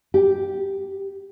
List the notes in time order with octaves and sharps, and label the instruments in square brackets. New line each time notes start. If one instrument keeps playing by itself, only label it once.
[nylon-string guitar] G4